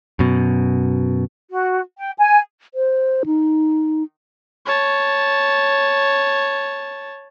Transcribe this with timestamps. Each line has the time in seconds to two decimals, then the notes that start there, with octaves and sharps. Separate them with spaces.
0.19 F#2 B2
1.52 F#4
1.97 G5
2.18 G#5
2.74 C5
3.26 D#4
4.66 C#5 A5